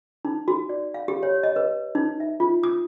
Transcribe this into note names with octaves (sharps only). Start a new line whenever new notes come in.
D#4
F#4
D5
F5
G4
C#5
D#5
B4
D#4
E5
F4
D#6